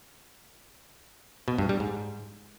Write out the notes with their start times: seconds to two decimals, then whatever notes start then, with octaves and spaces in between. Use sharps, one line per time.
1.48 B2
1.58 G2
1.69 G3
1.80 G#2